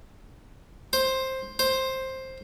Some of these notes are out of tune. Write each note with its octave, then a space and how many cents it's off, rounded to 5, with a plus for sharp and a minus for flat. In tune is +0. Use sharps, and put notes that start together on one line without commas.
C5 +10
C5 +10